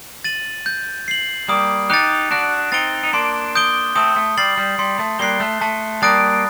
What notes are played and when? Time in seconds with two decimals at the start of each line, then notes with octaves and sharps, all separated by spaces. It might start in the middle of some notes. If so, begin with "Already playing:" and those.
0.24 A6 D#7 F#7
0.66 G6
1.08 C7 F#7
1.48 G3 A#3 D#6
1.90 D#4 G4 F#6 A6
2.31 D4 F#4 F#6
2.72 C4 D#4 A6 D7 G7
3.03 D#4
3.13 A#3 D4 C6
3.55 D#6 G6 D7 G7
3.95 A3 C4 D#6
4.16 A3
4.37 G3 A6 C7 F#7
4.58 G3
4.79 G3 C6
4.99 A3
5.19 G3 A#3 F#6 C7 G7
5.40 A3
5.61 A3 A5
6.02 G3 A#3 D#6 F#6 A6 D7